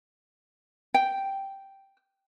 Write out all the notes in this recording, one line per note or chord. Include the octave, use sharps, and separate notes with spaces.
G5